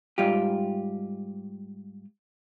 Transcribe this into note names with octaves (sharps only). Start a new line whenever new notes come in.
G#2 G3 F4 G4